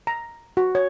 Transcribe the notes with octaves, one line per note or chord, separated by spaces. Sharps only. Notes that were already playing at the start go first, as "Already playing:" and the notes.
A#5
F#4
C#5